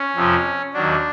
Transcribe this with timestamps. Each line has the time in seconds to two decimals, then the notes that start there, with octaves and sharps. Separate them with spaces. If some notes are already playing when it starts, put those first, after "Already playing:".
Already playing: C#4
0.15 F2 C3 F3
0.74 D#2 D#3 F#3 D4